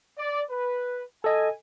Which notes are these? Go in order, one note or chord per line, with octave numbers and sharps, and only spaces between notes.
D5
B4
A4 D#5 G#5